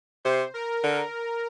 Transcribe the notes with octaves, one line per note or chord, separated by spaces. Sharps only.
C3 C5
A#4
D3